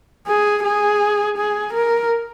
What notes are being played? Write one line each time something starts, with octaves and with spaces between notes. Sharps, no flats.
G#4
G#4
G#4
A#4